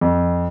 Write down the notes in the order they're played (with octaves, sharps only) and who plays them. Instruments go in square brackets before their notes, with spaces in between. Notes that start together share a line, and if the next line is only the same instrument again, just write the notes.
[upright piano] F2